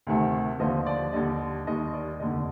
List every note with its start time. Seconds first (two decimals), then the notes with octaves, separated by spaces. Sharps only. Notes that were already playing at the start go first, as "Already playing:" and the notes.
0.07 D2 C3 D#3 A3
0.60 D#2 D3 F3 D#5
0.86 D5
1.13 D#2 D3 G3 D#5
1.67 D#2 D#3 G3 D#5
1.94 D5
2.20 F1 D#2 D3 D#5